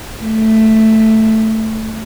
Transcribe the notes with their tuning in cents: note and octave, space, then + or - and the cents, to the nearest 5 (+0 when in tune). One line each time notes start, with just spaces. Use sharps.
A3 +5